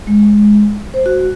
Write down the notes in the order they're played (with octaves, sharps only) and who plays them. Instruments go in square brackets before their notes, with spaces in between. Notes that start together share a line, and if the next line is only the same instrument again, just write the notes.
[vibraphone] G#3
C5
F#4